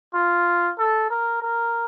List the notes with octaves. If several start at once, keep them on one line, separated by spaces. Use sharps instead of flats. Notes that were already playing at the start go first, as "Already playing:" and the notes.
F4
A4
A#4
A#4